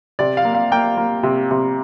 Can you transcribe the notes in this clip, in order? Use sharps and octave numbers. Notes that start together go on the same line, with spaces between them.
C3 D5
F5
A#3
F5
A#3 G5
A#3
C3
C3